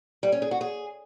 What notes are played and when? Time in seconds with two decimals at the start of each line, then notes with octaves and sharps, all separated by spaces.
0.23 G3
0.32 C#4
0.42 G#4
0.51 F#4
0.61 G#4